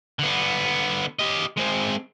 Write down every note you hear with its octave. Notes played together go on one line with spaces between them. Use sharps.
D3 B3
G4 D#5
G#3 C4